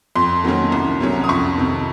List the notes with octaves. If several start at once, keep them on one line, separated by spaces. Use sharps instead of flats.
F2 C6
D#3 F#3 A#3 C#4
C2
C3 F#3 C#4
D#6
F2 C#6
C3 D#3